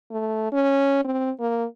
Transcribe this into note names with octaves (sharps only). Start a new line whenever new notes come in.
A3
C#4
C4
A#3